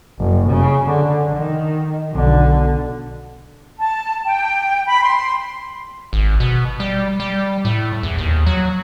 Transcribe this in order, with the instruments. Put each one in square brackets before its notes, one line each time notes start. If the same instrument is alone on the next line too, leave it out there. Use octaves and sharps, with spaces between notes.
[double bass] F#1
C#3
D3
D#3
B1 D3
[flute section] A5
G5
B5
C6
[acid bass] G#1
B2
G3
G3
A2
E2
D#2
F#3